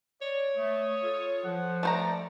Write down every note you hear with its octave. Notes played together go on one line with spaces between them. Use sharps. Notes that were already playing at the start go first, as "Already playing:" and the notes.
C#5 D5
A3 D#6
F4 A4
F3 F#5
A3 C5 D5 A#5